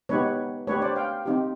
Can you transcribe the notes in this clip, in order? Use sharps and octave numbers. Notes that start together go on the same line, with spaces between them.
G#3 B3 D#4 G4 B4 C#5
A3 D4 G4 B4 C#5
C5 D5
F5 G5
C4 D#4 G4